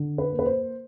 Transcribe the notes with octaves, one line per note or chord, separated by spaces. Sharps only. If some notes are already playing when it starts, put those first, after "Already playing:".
Already playing: D3
B4
A#3
B4
C5